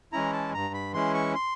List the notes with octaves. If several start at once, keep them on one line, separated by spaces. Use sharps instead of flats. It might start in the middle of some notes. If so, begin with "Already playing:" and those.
E3 G#3 C#4 E4 A#5
A5
G2 A#5
B5
E3 G#3 C#4 E4 C6
C#6
C6